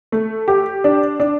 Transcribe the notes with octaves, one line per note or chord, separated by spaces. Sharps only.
A3
G4
D4
D4